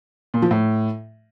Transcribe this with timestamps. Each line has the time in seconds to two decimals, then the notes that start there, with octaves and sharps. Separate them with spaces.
0.34 A#2
0.42 F3
0.51 A2